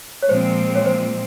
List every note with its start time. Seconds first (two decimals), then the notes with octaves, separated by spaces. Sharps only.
0.22 C#5
0.29 A#2 F3 G#3 C4 C5
0.75 C#5
0.86 C5